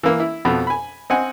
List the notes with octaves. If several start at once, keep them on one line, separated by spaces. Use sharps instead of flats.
E3 A#3
E4
F2 B2 B5
G#5 B5
C4 D#5 F#5 G#5